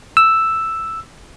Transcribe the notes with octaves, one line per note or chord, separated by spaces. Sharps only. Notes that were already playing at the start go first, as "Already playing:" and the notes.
E6